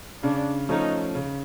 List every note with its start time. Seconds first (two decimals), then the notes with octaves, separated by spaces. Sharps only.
0.23 C#3 D4
0.69 F3 A3 C#4 D#4
1.15 C#3